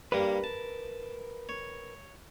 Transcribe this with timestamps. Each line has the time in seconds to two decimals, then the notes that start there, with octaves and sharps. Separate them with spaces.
0.12 G2 G3 A#3 A#4 B4
0.44 A5
1.49 C#5